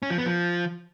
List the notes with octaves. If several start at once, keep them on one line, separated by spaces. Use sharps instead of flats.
C#4
F3
B3
F3